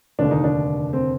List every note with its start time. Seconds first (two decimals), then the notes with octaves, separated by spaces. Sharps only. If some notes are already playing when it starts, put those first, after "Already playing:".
0.19 F1 D#2 D3 D4
0.31 D#4
0.44 D4
0.93 C4